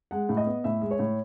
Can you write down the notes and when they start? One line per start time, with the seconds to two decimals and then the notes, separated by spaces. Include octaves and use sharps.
0.11 G#3 F#5
0.29 A2
0.37 D#5
0.46 B3
0.64 A2 E5
0.81 G#3
0.91 C#5
0.99 A2